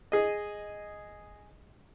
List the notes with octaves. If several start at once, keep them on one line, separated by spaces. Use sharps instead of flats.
G#4 D#5